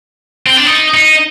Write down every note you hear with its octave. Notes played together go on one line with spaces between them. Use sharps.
C4
D4
D#4
D#4